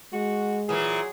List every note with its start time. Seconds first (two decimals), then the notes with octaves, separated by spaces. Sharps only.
0.13 G#3 F#4
0.69 A#2 E3 F#3 G#4